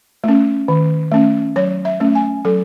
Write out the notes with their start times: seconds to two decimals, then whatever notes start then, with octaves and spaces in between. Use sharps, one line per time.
0.24 A3 C#4
0.68 D#3
1.12 A3 C#4
1.56 F#3 C#5
1.85 E5
2.00 A3 C#4
2.15 G#5
2.45 F#3 A4